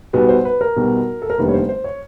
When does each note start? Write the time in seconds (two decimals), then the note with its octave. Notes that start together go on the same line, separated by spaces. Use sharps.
0.13 B1 B2 G3 B3
0.29 C5
0.45 B4
0.61 A#4
0.76 B1 B2 G3 B3
1.22 A4
1.30 A#4
1.38 F1 D#2 D3 G3 B3 B4
1.48 C#5
1.54 C5
1.69 C5
1.84 C#5